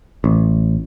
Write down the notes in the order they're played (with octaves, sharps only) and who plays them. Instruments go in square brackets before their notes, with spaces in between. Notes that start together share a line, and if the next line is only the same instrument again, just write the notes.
[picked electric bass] A1